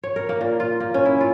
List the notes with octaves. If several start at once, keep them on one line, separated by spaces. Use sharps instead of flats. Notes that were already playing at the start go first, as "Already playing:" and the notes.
C#5
A#4
A#3
A#2
F4
A#3
C#4
E4
F4